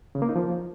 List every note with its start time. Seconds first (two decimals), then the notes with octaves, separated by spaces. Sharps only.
0.15 C#3
0.22 A#3
0.29 D#4
0.36 F3